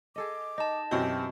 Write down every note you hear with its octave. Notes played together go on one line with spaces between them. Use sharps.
G#4 A4 D#5 D6
D#4 D#5 A5
F#2 B2 E3 C4 G4